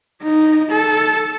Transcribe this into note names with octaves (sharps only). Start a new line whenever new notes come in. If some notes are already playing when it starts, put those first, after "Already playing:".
D#4
A4